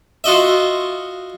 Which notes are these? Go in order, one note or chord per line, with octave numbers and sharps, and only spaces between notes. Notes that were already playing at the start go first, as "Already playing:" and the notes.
F4 F#4 D#5 E5